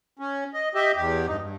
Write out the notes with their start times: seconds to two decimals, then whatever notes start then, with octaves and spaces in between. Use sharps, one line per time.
0.19 C#4
0.54 D#5
0.75 G4 D#5 E5
0.96 E2 G4
1.27 G2 D#4
1.39 G2